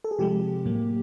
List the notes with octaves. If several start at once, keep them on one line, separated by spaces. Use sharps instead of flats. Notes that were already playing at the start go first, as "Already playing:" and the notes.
A4
G#4
C3 F3 G#3 G4
A2 F#3 A#3